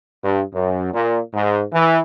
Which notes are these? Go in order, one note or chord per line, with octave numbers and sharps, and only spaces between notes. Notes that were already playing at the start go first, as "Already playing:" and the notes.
G2
F#2
A#2
G#2
E3